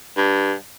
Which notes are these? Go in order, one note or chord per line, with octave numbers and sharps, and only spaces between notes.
G2